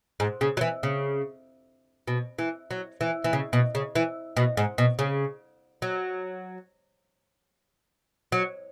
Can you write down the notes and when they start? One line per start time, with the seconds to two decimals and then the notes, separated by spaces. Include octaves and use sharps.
0.20 G#2
0.41 C#3
0.57 F#3
0.61 E3
0.83 C#3
2.08 B2
2.39 E3
2.71 F#3
3.01 E3
3.24 E3
3.33 C#3
3.53 B2
3.75 C#3
3.95 E3
4.37 B2
4.57 G#2
4.78 B2
4.99 C#3
5.82 F#3
8.32 F#3